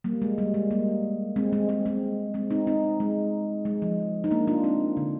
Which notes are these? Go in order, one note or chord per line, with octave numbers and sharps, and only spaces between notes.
G3 A#3
G#3
G3
G#3
G3 A#3
G#3 C4
G#3 C4
G#3 C4
G#3 C4
G#3 C4
C4 D#4
C4 D#4
G#3
G#3
F3
D#4
A#3 D4
D4 F4
C4 D#4
D3